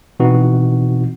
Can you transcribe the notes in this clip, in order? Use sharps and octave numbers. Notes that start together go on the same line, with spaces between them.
B2 E3 C4 D#4 F#4